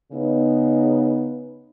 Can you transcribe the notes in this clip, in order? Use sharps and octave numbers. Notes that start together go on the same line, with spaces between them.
C#3 B3 D#4